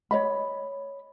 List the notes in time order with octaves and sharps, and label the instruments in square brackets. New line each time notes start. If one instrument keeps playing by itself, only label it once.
[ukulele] C#5 D#5 B5